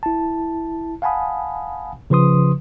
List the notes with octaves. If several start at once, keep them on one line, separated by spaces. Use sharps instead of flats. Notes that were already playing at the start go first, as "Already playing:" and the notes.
E4 A5
F5 F#5 G#5 A5 B5 D#6
C#3 F3 B4 C6 D#6